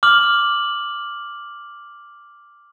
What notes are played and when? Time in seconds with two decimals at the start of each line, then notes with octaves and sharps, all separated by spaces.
0.03 D6 F6 F#7